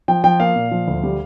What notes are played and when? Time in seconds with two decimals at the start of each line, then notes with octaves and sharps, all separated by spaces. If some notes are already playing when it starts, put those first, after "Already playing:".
0.08 F3 G5
0.24 F3 G5
0.40 A#3 F5
0.56 A#2
0.71 F3
0.88 D2
1.03 G3